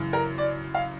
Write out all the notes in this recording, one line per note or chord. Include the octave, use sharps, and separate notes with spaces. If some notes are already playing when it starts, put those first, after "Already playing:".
Already playing: F#2 C#3 E3
A#4
D5
F5